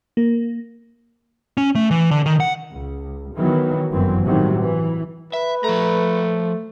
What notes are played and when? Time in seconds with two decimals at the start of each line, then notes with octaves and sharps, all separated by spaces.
0.17 A#3
1.58 C#4
1.75 A3
1.91 E3
2.11 D3
2.26 D#3
2.40 F#5
2.72 C#2
3.36 D#3 E3 F#3 B3
3.92 G1 F#2 E3 F#3 C4
4.25 A2 C3 D#3 F#3 G3
4.59 E3
5.33 B4 E5
5.64 F3 A3 A#5